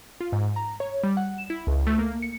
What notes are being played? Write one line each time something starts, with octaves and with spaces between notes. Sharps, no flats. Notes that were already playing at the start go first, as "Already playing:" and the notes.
F4
G#2
A#5
C#5
G3
F#5
E7
E4
C#2
A3
A#3
C#7